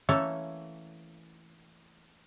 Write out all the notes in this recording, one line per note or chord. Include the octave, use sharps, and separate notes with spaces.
E3 A3 A#3 C#4 A4 C#5